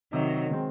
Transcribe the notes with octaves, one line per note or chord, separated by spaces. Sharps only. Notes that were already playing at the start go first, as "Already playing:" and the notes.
C3 D#3 F#3
D#3 G#3 C4